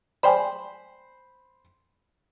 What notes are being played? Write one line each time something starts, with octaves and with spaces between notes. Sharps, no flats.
C5 D5 G5 G#5 B5